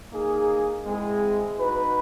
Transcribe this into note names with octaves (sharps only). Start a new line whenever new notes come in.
A#3 D#4 G#4
G#3 C4 E4 G#4
D#4 F#4 B4